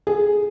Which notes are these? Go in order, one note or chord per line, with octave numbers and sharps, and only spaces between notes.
G#4